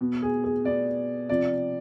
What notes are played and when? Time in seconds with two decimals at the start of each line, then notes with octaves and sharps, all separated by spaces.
0.01 B2
0.22 G#4
0.44 G#4
0.64 B2 D5
1.29 C3 F3 D5